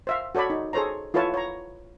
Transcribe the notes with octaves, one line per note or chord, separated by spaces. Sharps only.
C5 E5 F5
F#4 A4 C#5 D5 B5
D#4
G#4 A4 C5 C#5 A#5
E4 F4 A4 B4 C#5 A5
C#5 A#5